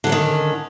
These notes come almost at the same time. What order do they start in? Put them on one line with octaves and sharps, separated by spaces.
D3 F#3 C#4 D#3